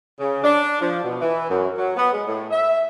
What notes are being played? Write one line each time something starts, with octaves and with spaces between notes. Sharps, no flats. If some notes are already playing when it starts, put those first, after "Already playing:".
C#3
D4
F3
B2
E3
F#2
F#3
B3
G#3
A2
E5